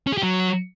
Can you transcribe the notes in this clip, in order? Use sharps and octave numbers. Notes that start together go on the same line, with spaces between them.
C#4
G#4
G4
F#3